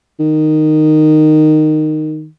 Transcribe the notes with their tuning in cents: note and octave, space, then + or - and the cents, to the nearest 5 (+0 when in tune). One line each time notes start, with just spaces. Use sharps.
D#3 -10